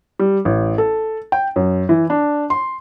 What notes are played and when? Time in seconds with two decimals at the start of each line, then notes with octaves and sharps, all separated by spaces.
0.19 G3
0.45 A1
0.78 A4
1.32 G5
1.56 F#2
1.89 E3
2.10 D4
2.50 C6